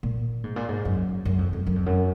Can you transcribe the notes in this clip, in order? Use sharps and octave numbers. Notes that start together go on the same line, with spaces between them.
A#2
G#2
A#2
G#2
F#2
F#2
F2
F2
F#2
F2
F#2